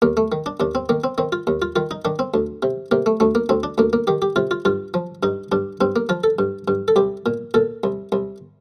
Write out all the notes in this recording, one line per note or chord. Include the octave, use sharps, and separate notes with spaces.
D#2 A#3
A3
D#3
D4
D#2 D4
C4
D#3 A#3
C4
D#3 C4
F4
D#2
F4
D#3 F4
D#4
D#3 D4
C4
D2
C3
C3 A#3
A3
D2 A3
A#3
D2 C4
D4
D2 A#3
A#3
D#3 G4
G4
C3 F4
F4
G2 F4
F3
G2 D#4
G2 D4
G2 C4
A#3
F3 F4
A4
G2
G2
A4
C2 G4
A#2
A#2 A4
C2
C2